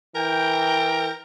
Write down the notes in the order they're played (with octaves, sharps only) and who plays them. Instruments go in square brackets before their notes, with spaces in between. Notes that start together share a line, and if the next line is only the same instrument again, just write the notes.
[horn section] E3 G5 [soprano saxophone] A#4